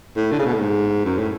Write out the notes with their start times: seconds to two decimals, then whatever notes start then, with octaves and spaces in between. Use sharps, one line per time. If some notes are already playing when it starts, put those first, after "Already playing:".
0.16 A2
0.32 D3
0.39 C#3
0.46 B2
0.53 A2
0.60 G#2
1.05 F#2
1.19 A2